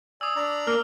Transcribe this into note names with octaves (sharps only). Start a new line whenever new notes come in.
D5 G#5 D#6 E6
D4 D5 A#5
A#3 F6